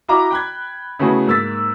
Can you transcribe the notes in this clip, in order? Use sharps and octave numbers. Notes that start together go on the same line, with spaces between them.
E4 F#4 D#5 F5 A#5 D6
G5 B5 F#6 G#6
C#3 A3 B3 E4 F#4 G#4
G#2 A#3 E6 A6 B6